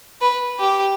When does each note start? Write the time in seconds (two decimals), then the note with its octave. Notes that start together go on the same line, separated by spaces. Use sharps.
0.21 B4
0.59 G4